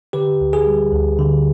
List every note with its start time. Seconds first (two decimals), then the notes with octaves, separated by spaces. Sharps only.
0.13 D3 G4 B4
0.40 D2
0.53 G#4
0.67 G3
0.93 D2
1.18 D3